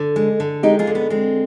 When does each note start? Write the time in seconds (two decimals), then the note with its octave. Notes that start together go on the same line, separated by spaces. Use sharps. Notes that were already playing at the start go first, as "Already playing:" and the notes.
Already playing: D3
0.16 G#3
0.40 D3
0.63 G#3 D#4 G4
0.79 F4 G#4
0.87 D3
0.95 B3
1.10 G#3 C4